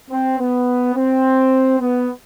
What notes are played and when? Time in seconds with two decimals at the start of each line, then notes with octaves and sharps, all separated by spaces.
0.11 C4
0.39 B3
0.95 C4
1.80 B3